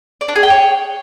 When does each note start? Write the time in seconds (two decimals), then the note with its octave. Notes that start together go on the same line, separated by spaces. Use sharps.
0.21 D5
0.28 D4
0.36 G#4
0.43 G5
0.50 C#5